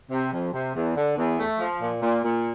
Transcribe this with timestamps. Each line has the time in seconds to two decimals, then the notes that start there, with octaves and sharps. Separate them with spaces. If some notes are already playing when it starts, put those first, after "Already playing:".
0.10 C3
0.32 F2
0.53 C3
0.75 E2
0.96 D3
1.17 E2
1.39 A3
1.59 F3
1.82 A#2
2.02 A#2
2.24 A#2